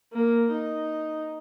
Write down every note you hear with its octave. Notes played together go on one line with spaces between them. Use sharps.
A#3
D#4